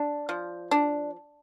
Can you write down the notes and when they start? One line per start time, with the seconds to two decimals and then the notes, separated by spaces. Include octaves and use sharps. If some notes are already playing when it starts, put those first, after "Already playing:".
Already playing: D4
0.29 F3
0.71 D4